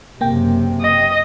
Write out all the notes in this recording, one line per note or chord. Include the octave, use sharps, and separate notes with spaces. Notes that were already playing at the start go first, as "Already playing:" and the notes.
F#1 C3 A#3 G5
D#5